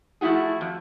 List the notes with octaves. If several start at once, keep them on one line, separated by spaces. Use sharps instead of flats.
F3 A3 E4 F#4 G#4
F2